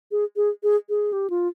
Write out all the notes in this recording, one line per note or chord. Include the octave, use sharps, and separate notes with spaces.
G#4
G#4
G#4
G#4
G4
F4